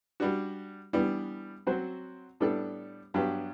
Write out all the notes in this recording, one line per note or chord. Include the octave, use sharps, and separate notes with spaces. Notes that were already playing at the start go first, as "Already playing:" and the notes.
G3 D4 F#4
E3 G3 B3 D4
F#3 C4 F#4 C5
A2 G3 B3 D4 A4
G2 F#3 B3 D4 G4